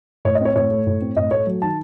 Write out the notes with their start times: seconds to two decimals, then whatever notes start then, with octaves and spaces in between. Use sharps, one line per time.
0.25 A2 C#5
0.35 D#5
0.41 C4 C#5
0.56 A2 C#5
0.71 A3
0.87 A2
1.01 C4
1.17 A2 D#5
1.31 A3 C#5
1.47 F#3
1.62 D#3 A5